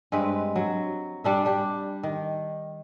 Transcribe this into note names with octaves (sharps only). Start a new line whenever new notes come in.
G2 G#3 C4 B4
F#3
G3 D4 E5
G3 D4 G4
D#3